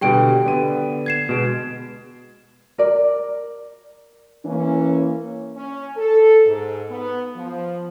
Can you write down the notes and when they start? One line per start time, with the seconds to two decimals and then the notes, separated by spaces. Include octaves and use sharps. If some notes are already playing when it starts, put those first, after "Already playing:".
0.01 B2 D3 G3 G4 G5 D7
0.45 D3 B3 D#7
1.06 G#6 C7 E7
1.29 B2 G#3 D7
2.78 A#4 D5
4.46 E3 A#3 C#4
5.56 C#4
5.97 A4
6.46 G#2
6.90 B3
7.36 F3